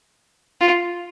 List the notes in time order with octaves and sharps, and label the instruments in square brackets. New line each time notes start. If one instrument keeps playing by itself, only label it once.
[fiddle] F4